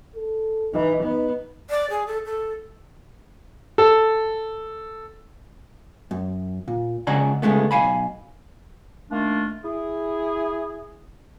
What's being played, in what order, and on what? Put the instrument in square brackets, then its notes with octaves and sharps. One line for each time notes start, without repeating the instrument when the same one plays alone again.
[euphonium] A4
[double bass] E3 [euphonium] D#4
[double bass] B3 [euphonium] D#4
[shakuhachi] D5
G#4
A4
A4
[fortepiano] A4
[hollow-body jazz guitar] F#2
A#2
C#2 C#3 D5 F#5 G#5 A#5
C#3 G#3 A3 B3
B1 F5 G#5 B5
[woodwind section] D#3 A3 A#3 D4 F4
E4 G#4